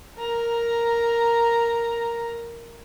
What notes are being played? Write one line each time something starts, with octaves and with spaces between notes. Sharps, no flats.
A#4 A#5